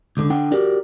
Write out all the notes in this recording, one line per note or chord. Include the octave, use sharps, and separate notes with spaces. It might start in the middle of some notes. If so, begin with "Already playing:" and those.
C#2 D3
D3 D4 F#5 G5
F#4 G4 A#4 D5